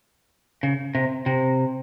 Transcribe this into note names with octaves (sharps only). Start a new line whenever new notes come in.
C#3
C3
C3